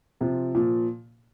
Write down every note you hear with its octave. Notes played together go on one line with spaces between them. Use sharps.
C3 F3
A#2 F3